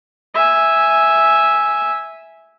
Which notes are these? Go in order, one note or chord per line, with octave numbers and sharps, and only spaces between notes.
E5 G#5